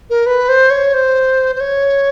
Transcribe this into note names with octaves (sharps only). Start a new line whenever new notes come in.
A#4
B4
C5
C#5
C5
C5
C#5